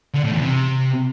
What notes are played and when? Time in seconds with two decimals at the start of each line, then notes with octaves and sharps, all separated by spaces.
0.14 D3
0.23 A2
0.32 E2
0.41 C3